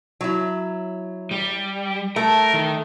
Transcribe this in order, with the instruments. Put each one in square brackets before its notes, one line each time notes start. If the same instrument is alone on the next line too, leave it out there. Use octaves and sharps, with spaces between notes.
[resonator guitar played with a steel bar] F#3 E4
[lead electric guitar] G3
[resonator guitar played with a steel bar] A3 [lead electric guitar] A#4
[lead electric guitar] D#3